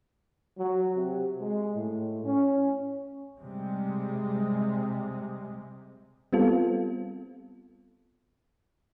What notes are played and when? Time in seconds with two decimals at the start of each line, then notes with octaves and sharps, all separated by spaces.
0.58 F#3
0.95 C3
1.41 G#3
1.75 A2
2.25 C#4
3.40 C3 G3 G#3
6.33 G3 B3 C4 F4 A4